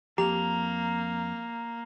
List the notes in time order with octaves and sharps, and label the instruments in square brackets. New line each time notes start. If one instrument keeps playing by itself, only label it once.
[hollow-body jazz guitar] F2 [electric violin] A#3 [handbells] G4 [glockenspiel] A#5 F7